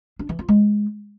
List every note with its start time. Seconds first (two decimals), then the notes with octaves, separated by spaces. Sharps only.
0.19 D4
0.29 E3
0.39 F4
0.49 G#3